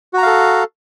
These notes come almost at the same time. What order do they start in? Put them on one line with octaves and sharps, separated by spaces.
F#4 A#5 F5 A4